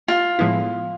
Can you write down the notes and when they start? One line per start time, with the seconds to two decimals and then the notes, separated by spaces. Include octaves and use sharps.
0.08 F4
0.39 A2 F3 G#3 B3 E4